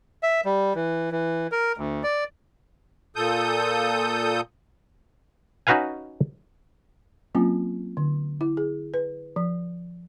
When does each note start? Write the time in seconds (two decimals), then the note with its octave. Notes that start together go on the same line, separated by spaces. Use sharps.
0.23 E5
0.45 G3
0.75 E3
1.12 E3
1.52 A#4
1.77 D2
2.03 D5
3.16 A#2 A4 D#6 G6
5.67 C#4 D#4 F#4 B4 F5 G#5
7.35 F#3 A#3 C4 C#4 F4
7.97 D3
8.41 E4
8.57 G#4
8.94 B4
9.36 F3